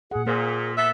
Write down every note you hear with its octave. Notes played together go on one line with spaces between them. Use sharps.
A#2 G#4 F#5
A#2 A#3 G#4 C5
B3 A4 E5